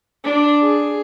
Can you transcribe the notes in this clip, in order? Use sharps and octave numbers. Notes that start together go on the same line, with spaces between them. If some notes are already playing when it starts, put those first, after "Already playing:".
D4
G#4